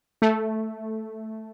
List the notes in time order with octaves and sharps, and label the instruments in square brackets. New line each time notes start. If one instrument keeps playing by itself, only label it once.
[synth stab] A3